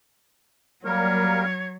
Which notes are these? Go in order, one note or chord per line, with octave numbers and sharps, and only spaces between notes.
F#3 G3 A#3 A#4 C#5